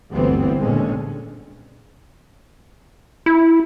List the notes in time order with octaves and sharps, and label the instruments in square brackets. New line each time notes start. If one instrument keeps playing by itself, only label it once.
[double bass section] G1 D2 G2 E3 B3 C4
D#2 A#2 D3 G#3 C#4
[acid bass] E4